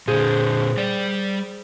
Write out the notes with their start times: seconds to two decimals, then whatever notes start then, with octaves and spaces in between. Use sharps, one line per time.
0.08 A#2 D3 G#4 C5
0.77 G3 D5